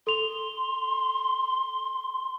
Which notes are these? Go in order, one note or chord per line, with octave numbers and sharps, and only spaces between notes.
A4 C6 F7